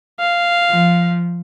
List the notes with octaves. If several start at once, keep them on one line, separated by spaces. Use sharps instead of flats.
F5
F3